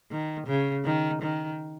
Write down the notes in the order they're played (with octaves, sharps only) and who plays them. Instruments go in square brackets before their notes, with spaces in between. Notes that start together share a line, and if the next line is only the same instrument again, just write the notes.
[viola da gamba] D#3
C#3
D#3
D#3